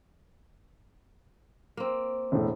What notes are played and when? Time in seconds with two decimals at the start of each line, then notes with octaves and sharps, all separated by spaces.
1.77 A#3 C4
2.32 E1 A2